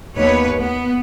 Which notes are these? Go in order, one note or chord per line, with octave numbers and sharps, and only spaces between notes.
D#2 B3 B4 C#5
B3